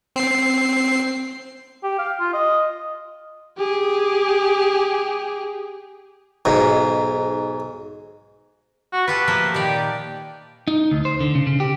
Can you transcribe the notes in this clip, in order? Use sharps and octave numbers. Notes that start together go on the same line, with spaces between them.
C4 C7
G4
F5
F4
D#5
G4 G#4
B1 G#2
F#4
F4 G4 A4 B4
F3 A3 A#3
A#2 D#3 G4 D5
D#4
D2
C5
D3
C#3
C#3
G4